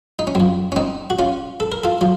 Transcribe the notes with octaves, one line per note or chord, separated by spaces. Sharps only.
D#4
C#4
F#2 F3 C4
C#4
C4 D#4
F#4
C#4 F4
A4
A#4
F4 A4
F#3 F4